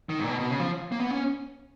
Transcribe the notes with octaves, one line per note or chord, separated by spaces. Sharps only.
D#3
G#2
A#2
B2
B2
C#3
F3
A#3
B3
C#4